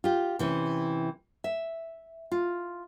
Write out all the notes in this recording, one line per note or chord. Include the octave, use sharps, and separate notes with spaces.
F4 G4
C3 E3 C#4
E5
F4